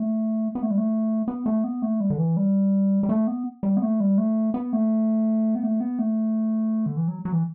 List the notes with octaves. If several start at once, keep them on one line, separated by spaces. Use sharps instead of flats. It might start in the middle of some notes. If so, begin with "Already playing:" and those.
Already playing: A3
B3
A3
G3
A3
B3
A3
B3
A3
G3
D3
E3
G3
G3
A3
B3
G3
B3
A3
G3
A3
B3
A3
B3
A3
B3
A3
D3
E3
F#3
F#3
E3